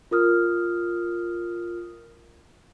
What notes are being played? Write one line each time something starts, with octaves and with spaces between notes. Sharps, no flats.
F4 A#4 D#6 F6